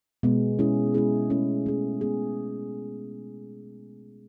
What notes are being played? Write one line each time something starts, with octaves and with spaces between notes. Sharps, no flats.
B2 G#3 B3
G#3 C#4 E4 G#4
G#3 C#4 E4 G#4
A3 C#4 E4 G#4
A3 C#4 E4 G#4
G#3 B3 E4 G#4